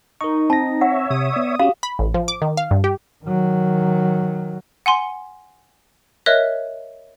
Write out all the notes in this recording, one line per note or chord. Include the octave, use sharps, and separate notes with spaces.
D#4 A#4 C#6
C4 A5 A#6
C#5 E5 F#5
C3 D#6
B3 D5
C#4 F#4 G4 F5
B5
A1
F3
D6
D#3
F5
G2
G4
D#3 F#3
F#5 G#5 C6
A#4 C#5 D#5 E5 F#6